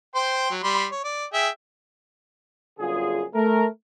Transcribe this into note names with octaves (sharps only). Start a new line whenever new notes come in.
C5 G5 C6
F#3
G3 B5 C6
C#5
D5
G#4 E5 G5
G1 F#2 D3 F4 G#4
A3 A#4